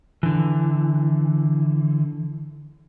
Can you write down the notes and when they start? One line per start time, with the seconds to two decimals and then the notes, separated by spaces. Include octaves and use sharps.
0.23 D3 E3